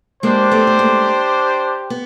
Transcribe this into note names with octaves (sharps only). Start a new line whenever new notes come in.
G#3 A#3 D4 G4 C5
A3 B3
B3
G#3 A#3
B3